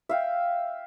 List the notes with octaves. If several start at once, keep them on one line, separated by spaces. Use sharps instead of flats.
E5 F5 G5